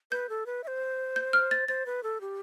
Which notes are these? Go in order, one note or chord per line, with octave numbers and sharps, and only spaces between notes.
B4 G6
A4
B4
E5
C5
G6
F6
A6
C5 A6
B4
A4
G4